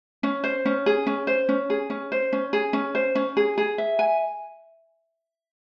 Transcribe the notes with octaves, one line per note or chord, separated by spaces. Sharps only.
C#4
C5
C#4
G#4
C#4
C5
C#4
G#4
C#4
C5
C#4
G#4
C#4
C5
C#4
G#4
G#4
E5
G#5